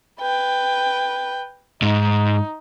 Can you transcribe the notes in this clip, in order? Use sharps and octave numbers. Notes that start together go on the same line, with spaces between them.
B4 G5
G#2 D#4